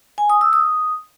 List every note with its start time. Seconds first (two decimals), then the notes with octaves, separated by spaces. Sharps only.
0.18 G#5
0.30 D#6
0.41 E6
0.53 D#6